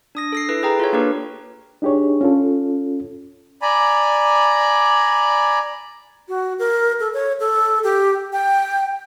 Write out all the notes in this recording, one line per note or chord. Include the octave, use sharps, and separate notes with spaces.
D4 D#6 A#6
A4 A#6 C7
E4 A4 B4
G#4 B4 G5 A#5
F4 A4 C#5
A#3 D4 G4 A#4 B4 C#5
D4 D#4 G4 G#4 C#5
C#4 F4 A4
D5 G#5 A#5 B5
F#4
A#4
A4
C#5
A4
G4
G5